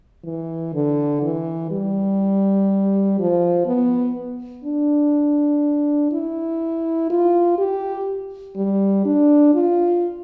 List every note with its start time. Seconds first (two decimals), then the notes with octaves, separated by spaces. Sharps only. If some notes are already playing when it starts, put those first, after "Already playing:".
0.24 E3
0.74 D3
1.23 E3
1.71 G3
3.19 F3
3.67 B3
4.64 D4
6.12 E4
7.10 F4
7.58 G4
8.56 G3
9.05 D4
9.54 F4